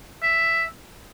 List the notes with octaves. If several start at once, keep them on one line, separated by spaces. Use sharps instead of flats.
E5